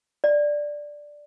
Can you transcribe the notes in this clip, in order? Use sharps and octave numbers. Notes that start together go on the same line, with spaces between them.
D5